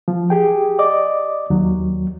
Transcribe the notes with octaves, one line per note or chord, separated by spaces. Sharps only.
F3
G4 G#4 G5
D5 D#5 D6
D#2 F#3